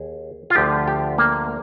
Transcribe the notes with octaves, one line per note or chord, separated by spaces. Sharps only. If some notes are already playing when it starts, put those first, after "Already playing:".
Already playing: D#2 G#4
F4
D2 D3 F3 G4
G4
A#3